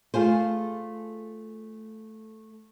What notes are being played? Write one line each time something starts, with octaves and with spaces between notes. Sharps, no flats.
A3 F4 G#4 C5